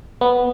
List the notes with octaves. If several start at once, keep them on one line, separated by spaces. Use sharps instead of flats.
B3